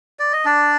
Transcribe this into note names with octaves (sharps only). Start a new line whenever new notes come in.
D5
D#5
D4 D5